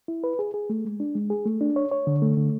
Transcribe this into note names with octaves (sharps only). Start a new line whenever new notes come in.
E4
B4
G#4
G#4
A3
G#3
D4
G#3
G#4
A3
D4
C#5
C#5
D3
A3
D3